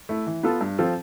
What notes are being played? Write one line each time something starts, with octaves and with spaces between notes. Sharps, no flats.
A3 E4
E3
B3 F4 A4
G2
F3 C4 F4 A4